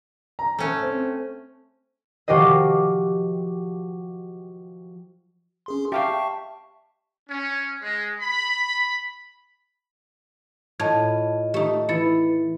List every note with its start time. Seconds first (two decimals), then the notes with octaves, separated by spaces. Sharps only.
0.39 A#5
0.59 A3 C#4
0.83 C4
2.28 F3 F#4 G4 C5 D#5
5.66 C#4 G#4 C6
5.92 G4 E5 F5 G5 A5 C#6
7.28 C#4
7.81 G#3
8.20 B5
10.80 A2 F4 D#5 A5 G#6
11.54 A3 D#4 G4
11.89 E3 E4 A6 C#7